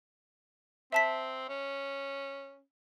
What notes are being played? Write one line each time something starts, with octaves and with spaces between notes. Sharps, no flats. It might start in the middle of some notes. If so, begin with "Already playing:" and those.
C4 E5 A5 B6
C#4